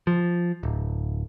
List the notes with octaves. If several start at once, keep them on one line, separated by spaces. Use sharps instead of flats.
F3
D1